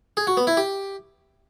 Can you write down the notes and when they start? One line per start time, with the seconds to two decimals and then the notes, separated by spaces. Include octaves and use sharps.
0.17 G#4
0.27 F#4
0.37 B3
0.47 E4
0.57 G4